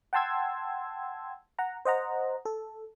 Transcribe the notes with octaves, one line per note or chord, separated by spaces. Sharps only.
F#5 G5 A5 C6 E6 G#6
F#5 A#5
C5 D#5 F#5 A#5
A4